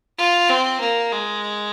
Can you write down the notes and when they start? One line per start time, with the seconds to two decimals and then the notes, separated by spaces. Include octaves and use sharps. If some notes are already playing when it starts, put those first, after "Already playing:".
0.18 F4
0.49 C4
0.80 A#3
1.12 G#3